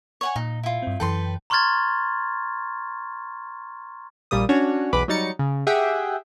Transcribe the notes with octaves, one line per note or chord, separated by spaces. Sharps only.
C#5 F#5 G#5 C#6
A#2 D#4
E4 F4
G2 C4
F#2 E3 A4 B4 G5 C6
A#5 C6 C#6 F6 G#6 A6
A#1 A#2 G3 A#3 D#6
C#4 D4 F#4 C#5
B1 E2 B4 B5 D6
F#3 G3 D#4 A6 C#7
C#3
G4 G#4 E5 F#5 G5